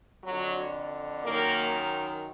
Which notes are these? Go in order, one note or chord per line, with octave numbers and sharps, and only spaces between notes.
F2 D3 F#3
F#2 D#3 A#3